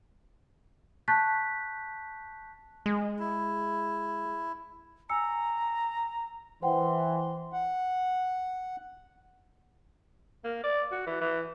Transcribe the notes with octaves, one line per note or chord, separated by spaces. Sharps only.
A5 C#6 F#6 G6 A6 B6
G#3
E4
G#5 A#5 E6 C#7
E3 C5 F#5 G5 C6
F#5
A#3
D5
F#4
E3
E3